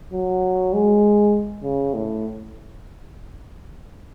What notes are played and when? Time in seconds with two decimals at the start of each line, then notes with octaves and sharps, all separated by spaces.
0.13 F#3
0.74 G#3
1.63 C#3
1.94 A2